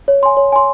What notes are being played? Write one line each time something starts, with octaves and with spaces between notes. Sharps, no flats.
C#5
G#5 C6
C#5
G#5 C6